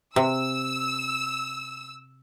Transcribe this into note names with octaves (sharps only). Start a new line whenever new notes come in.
C3 E6